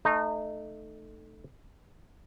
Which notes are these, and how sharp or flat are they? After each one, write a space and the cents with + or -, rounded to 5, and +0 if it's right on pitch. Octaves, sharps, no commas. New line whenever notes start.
A3 +0 D#4 -25